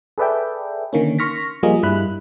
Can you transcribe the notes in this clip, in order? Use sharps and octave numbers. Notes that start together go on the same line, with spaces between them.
G#4 A4 B4 D5 E5 G5
D3 D#3 A#3 C#4
C6 C#6 F6 A#6 B6
F3 G3 A#3 F4 G#4 D#5
G2 G3 E4 B5 F#6